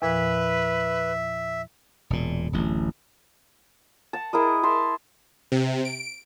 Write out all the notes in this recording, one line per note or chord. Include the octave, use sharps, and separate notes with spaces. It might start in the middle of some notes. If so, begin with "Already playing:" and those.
E2 A#2 F3 B4 E5
E1 A#2
D1 A1
F#5 A5
E4 G#4 A#4 D#5
E5 A5 C6
C3
D7